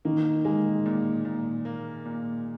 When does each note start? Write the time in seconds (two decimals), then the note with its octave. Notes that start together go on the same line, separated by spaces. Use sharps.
0.05 D#3 A#3
0.44 G#3 A#3
0.86 A#2
1.25 A#2
1.65 A#3
2.05 A#2